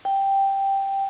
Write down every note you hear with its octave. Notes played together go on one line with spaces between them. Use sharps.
G5